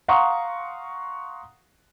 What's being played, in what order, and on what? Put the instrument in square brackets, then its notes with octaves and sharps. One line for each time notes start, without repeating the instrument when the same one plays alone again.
[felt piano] F5 F#5 A#5 C6 C#6 D#6